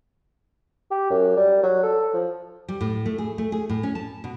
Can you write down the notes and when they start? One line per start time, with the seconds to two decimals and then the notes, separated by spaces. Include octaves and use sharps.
0.91 G4
1.10 F#2
1.37 G3
1.63 F#3
1.83 A4
2.14 F3
2.68 G3
2.81 A2
3.06 A3
3.18 G#4
3.38 A3
3.52 G#4
3.70 A2
3.83 C#4
3.95 A5
4.24 B2